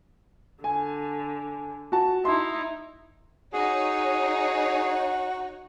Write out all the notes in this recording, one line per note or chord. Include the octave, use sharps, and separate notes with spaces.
D3 G#5
F#4 A5
D#4 E4 C6
D#4 F#4 G#4 C#5